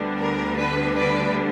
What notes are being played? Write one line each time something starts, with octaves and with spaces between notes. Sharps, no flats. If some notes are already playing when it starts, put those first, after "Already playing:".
Already playing: D2 D3 G3 B3 D4
A#4
B4
B4 D5